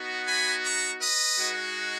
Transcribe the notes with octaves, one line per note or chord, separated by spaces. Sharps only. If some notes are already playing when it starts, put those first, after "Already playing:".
Already playing: B3 D#4 F#4
G#5 B5
A#5 C#6
B4 D#5
G#3 D#4 F#4